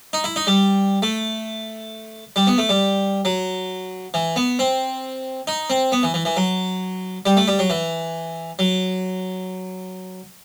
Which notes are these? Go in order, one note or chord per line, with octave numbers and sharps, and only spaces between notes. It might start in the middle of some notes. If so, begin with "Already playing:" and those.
D#4
E4
D#4
G3
A3
G3
B3
A3
G3
F#3
E3
B3
C4
D#4
C4
B3
E3
E3
E3
F#3
G3
A3
G3
F#3
E3
F#3